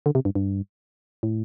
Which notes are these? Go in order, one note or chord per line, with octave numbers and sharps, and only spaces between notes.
D3
C3
G2
G2
A2